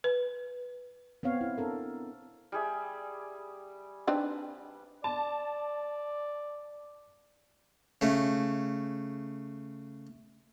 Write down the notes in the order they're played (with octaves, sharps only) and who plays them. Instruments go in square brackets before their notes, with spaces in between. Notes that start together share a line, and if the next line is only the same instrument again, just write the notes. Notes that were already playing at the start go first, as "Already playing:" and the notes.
[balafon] B4
[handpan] B3 C4 C#5 F5
E4
D4 A4 A#4
[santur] G3 G#4 E5
[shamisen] C4 D4 D#4 [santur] B4
[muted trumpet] D5 [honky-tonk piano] A5
[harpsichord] C#3 A3